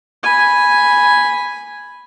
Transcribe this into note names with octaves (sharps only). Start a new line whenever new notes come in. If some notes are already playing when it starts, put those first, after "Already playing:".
G#5 B5